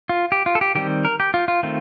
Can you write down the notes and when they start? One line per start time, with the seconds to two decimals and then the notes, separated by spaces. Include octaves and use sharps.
0.09 F4
0.32 G4
0.46 F4
0.55 A4
0.61 G4
0.75 D#3 G3 C4 G4
1.05 A#4
1.20 G4
1.34 F4
1.48 F4
1.63 D#3 A3 C4 F4